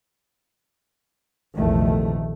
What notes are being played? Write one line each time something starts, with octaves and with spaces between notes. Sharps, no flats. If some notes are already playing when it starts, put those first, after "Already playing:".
A#1 E2 C3 D#3 A3